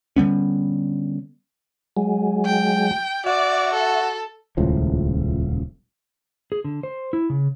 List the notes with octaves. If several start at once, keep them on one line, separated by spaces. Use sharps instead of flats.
D3 G3 B3 C#4
F#3 G#3
G5
F#4 D5 E5
A4
D#1 C#2 A2 F3
G#4
D3
C5
E4
C#3